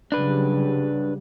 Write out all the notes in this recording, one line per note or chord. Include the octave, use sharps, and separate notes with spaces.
C#3 F#3 G3 D4 B4